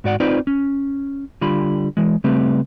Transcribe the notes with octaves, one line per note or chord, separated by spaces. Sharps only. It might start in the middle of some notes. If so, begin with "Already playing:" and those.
G#2 F#4 D5 F#5
C4 D#4 F4 B4 C5 D5
C#4
D3 G3 F4 B5
E3 G#3
C#3 G3 A3 C4 B4